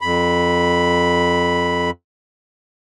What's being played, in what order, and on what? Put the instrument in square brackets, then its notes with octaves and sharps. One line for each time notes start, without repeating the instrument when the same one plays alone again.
[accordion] F2 B5